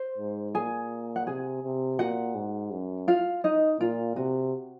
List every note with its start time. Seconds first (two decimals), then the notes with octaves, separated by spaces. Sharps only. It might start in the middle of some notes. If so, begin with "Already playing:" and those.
Already playing: C5
0.18 G#2
0.54 A#2 G#4 G#5
1.16 F#5
1.27 C3 G#4 G#5
1.63 C3
1.99 A#2 F#4 F#5
2.35 G#2
2.71 F#2
3.08 F4 F5
3.44 D#4 D#5
3.80 A#2 F4
4.16 C3 F#4